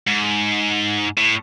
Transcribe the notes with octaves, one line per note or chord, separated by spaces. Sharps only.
G#2
A2